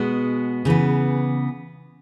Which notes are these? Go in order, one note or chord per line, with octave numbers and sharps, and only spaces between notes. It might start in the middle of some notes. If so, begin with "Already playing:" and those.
Already playing: B2 G#3 B3 F#4
C#3 E3 B3